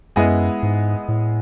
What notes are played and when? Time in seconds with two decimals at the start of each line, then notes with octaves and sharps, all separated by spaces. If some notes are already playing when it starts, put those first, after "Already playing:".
0.16 F#2 G#3 B3 E4 G#4 D#5
0.63 G#2
1.09 A2